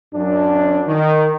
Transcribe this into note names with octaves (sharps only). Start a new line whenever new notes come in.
F#2 D4
D#3